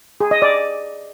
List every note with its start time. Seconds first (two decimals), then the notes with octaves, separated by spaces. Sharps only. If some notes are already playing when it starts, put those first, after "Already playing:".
0.21 G#4
0.31 D#5
0.42 D5